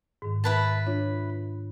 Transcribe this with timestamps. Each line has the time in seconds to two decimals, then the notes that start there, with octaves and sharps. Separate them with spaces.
0.22 G#2 D#3
0.44 E4 B4 A5
0.87 D4 F4 C#5